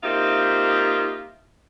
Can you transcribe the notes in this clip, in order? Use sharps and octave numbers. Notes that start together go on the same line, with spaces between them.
A#3 C4 D#4 F4 G4 E5